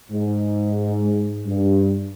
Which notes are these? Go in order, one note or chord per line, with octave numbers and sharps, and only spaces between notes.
G#2
G2